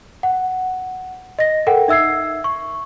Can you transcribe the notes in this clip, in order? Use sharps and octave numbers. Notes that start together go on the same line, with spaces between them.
F#5
D#5 A#6
A4 A#4 F#5 G5
D#4 E5 E6 G#6 C7
C#6